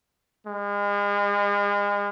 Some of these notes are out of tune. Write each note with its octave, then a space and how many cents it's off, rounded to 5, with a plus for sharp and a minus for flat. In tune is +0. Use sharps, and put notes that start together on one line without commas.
G#3 -35